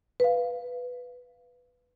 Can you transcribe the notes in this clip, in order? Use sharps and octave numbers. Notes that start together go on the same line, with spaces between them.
B4 F5